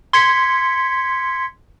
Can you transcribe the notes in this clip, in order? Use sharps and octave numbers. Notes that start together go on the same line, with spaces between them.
C6 G#6 B6 C#7